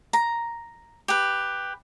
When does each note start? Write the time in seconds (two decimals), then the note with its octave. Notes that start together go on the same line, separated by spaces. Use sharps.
0.13 A#5
1.08 G4 B4